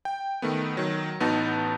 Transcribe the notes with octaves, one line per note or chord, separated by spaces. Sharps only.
G5
D#3 A3 B3
D#3 F#3
A1 B3 D#4 F#4 A5